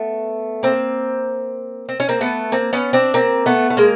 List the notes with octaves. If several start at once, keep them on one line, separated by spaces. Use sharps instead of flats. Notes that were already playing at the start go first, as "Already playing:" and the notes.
Already playing: A3 B3
A#3 C4
C4
C#4
A#3 C4
A3 B3
A#3 C4
B3 C#4
C4 D4
A#3 C4
A3 B3
A3
G#3 A#3